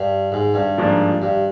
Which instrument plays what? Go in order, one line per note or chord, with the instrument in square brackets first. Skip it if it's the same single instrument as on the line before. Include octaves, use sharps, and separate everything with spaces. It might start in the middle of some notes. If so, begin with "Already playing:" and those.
Already playing: [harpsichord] G2
G#2
G2
[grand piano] G#2 F3 A#3 D4
[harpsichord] G2